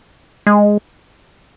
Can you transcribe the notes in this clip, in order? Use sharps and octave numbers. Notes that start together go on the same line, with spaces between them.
G#3